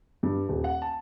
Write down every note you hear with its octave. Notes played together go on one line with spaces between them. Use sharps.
G2
D#1
F#5
A5